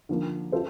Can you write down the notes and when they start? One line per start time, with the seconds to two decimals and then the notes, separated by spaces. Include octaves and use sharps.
0.09 D3 F3 A#3
0.52 F4 A4 C5